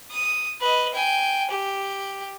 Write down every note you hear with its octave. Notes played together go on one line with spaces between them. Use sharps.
D#6
B4 D#5
G5 G#5
G4